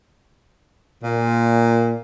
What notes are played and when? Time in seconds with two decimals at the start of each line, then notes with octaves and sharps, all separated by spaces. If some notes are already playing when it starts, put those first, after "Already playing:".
1.03 A#2